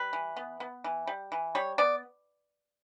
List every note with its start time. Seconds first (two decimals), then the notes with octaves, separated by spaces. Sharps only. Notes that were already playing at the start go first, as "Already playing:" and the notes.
Already playing: G3 B4
0.13 E3
0.36 B3
0.60 B3
0.84 E3
1.07 G3
1.32 E3
1.55 G3 C#5
1.78 B3 D5